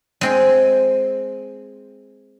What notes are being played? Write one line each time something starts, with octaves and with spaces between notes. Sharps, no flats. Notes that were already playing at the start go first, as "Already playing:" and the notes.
G#3 C4 G#4